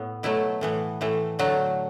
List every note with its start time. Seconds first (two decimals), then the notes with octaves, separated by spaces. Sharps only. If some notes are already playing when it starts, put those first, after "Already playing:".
Already playing: A2 B3
0.23 B2 F#3 A3 E4
0.61 A2 E3 B3
1.01 A2 E3 A3
1.39 D3 F#3 A3 F#4